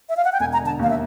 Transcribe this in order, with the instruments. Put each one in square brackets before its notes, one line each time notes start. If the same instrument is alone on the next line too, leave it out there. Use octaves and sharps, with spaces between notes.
[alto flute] E5
F5
F#5
G5
[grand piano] E1 [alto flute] G#5
[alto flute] A#5
[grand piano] D3
[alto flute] A5
[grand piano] D#2 [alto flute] F5
[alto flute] E5